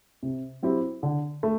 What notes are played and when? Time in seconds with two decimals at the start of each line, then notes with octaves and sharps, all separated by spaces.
0.23 C3
0.63 F#3 C4 E4 G4
1.03 D3
1.43 A3